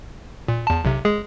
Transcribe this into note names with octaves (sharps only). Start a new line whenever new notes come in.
A#2
E2 A5
B1 C3
G#3 G#4